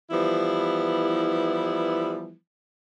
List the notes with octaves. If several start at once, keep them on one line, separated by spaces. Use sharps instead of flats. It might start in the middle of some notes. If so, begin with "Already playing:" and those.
E3 F3 G3 B3 E4